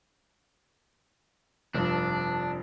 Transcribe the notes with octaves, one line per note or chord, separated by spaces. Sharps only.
F1 G2 F3 D4